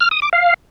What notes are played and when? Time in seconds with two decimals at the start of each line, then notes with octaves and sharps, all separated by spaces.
0.01 F6
0.11 D#6
0.22 D6
0.33 F5